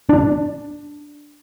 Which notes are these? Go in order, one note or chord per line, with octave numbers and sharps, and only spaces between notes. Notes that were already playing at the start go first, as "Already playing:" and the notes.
D4